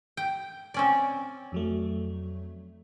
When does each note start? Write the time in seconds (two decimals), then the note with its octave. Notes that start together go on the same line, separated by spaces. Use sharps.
0.17 G5
0.74 C4 C#4 D5
1.52 F2 F#3 A3